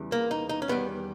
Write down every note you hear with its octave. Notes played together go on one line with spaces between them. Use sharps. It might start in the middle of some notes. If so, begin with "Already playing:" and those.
Already playing: E2 C#3 E3 G3
A#3
D#4
D#4
C#4
E2 D#3 G3 B3